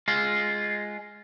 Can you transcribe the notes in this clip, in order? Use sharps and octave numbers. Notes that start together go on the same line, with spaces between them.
G#3 F4